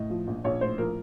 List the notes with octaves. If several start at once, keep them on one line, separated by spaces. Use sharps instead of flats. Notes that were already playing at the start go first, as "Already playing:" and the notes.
Already playing: A2 D#5
F3
A#1
A#1 C#5
A2 C5
F3 A#4